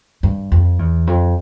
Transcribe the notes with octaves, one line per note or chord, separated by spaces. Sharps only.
G2
F2
E2
F2